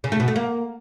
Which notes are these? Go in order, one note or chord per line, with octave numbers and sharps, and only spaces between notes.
C#3
A3
B2
A3
A#3